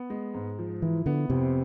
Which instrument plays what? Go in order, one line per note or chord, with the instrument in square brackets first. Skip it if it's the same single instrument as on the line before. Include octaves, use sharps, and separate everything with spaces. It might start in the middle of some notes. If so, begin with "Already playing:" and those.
Already playing: [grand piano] B3
G#3
G#2
F3
[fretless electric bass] E3 [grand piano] E4
[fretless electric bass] D3 [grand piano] B3
[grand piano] F2 [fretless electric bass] C3